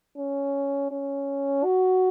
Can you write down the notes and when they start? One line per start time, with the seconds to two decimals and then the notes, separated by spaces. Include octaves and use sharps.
0.17 C#4
0.92 C#4
1.64 F#4